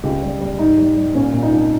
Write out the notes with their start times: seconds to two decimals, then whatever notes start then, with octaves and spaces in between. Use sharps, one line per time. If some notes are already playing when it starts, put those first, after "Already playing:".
0.04 C#2 G4
0.22 G3
0.40 G3
0.59 G#2 D#4
0.78 G3
0.96 G3
1.15 A#2 C#4
1.33 A#2
1.43 D#4
1.52 C2